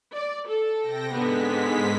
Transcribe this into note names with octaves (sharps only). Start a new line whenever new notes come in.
D5
A4
C3 G5 A#6
G#2 D3 G#3 B3 B6